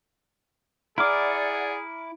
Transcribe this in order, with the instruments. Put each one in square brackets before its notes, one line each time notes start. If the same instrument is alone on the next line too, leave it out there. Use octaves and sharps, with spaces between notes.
[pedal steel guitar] E4 D6 [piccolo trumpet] G#4 [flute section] D5 F#5 [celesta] A#5 F6